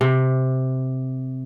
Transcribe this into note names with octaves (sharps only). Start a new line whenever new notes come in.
C3